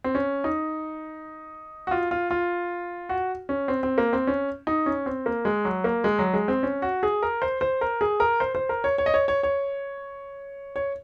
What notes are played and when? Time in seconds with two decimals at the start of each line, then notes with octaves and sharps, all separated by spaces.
0.04 C4
0.15 C#4
0.44 D#4
1.87 F#4
1.91 F4
2.11 F4
2.31 F4
3.09 F#4
3.49 C#4
3.68 C4
3.83 C4
3.98 A#3
4.13 C4
4.27 C#4
4.67 D#4
4.86 C#4
5.06 C4
5.26 A#3
5.45 G#3
5.65 F#3
5.84 A#3
6.04 G#3
6.19 F#3
6.34 G#3
6.48 C4
6.63 C#4
6.82 F#4
7.03 G#4
7.23 A#4
7.42 C5
7.61 C5
7.81 A#4
8.01 G#4
8.20 A#4
8.40 C5
8.55 C5
8.69 A#4
8.84 C#5
8.98 C#5
9.06 D#5
9.14 C#5
9.28 C#5
9.43 C#5
10.76 C#5